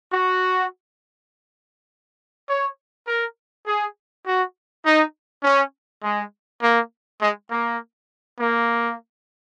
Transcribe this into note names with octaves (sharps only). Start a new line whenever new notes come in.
F#4
C#5
A#4
G#4
F#4
D#4
C#4
G#3
A#3
G#3
A#3
A#3